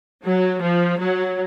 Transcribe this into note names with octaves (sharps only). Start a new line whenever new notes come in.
F#3
F3
F#3